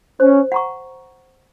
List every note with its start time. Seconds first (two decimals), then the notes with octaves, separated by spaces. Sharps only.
0.20 C#4 C5
0.52 F#5 A#5 C#6